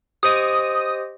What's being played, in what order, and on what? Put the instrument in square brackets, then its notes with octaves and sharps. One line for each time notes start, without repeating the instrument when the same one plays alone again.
[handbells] G4 C5 D#5 [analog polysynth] D#6